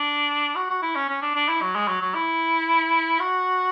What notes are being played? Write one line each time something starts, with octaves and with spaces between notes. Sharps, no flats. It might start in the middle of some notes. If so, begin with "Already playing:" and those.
Already playing: D4
F#4
F#4
E4
C#4
C#4
D4
D4
E4
F#3
G#3
F#3
F#3
E4
F#4